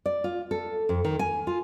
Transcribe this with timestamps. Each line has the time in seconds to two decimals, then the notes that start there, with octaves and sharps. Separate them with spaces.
0.06 D5
0.24 F4
0.51 A4
0.89 F2
1.05 D#3
1.19 G#5
1.47 F4